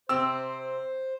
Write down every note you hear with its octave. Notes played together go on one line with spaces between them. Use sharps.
C3 C4 C5 E6